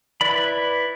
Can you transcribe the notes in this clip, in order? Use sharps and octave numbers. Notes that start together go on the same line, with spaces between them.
E4 B4 D5 B5